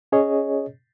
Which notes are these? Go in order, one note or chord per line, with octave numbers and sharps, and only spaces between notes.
C#4 G#4 C#5 D#5